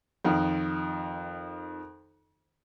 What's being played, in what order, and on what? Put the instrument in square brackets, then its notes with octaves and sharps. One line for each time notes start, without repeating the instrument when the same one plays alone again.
[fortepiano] F2 D#3